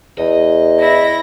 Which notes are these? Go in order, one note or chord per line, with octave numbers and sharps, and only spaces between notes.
E2 D#5
E4 A#6